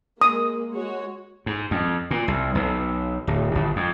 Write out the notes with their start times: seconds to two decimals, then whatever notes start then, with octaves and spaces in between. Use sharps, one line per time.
0.21 G#3 A#3 D#6
0.73 G#3 F#4 C#5
1.46 G#2
1.71 F2
2.11 A#2
2.28 C2
2.55 B1
3.27 D1
3.55 G1
3.76 F2